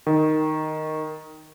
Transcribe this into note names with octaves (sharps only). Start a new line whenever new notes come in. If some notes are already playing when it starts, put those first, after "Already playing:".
D#3